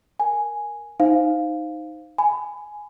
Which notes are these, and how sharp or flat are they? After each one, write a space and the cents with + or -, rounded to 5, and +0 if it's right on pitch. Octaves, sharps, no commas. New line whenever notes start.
A#4 +0 G#5 +0
D#4 +0 C5 +0 F5 +0
G#5 +5 B5 +20